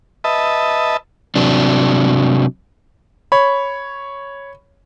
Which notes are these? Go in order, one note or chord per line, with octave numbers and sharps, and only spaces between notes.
B4 D#5 E5 A5
C3 F#3 D4
C#5 B5